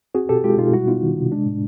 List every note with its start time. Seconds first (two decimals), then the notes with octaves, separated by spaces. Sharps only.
0.15 C4 F#4 G#4
0.29 B2 G4 A4
0.44 G#3 F4 G4
0.58 B2 D#4 F4
0.73 G3 E4 F#4
0.87 B3 D#4 F4
1.03 D#3
1.17 C3
1.32 G#3 D4
1.46 A2